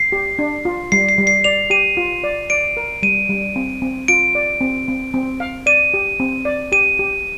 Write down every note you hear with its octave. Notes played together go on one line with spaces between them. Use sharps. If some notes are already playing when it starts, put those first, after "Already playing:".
Already playing: C7
G4
D4
F4
G3 C7
C7
G3
C7
D5 F7
G4 D#7
F4
D5
D5 D7
A#4
G3 D#7
G3
C4
C4
F4 D7
D5
C4
C4
C4
F5
D5 D#7
G4
C4
D5
G4 D#7
G4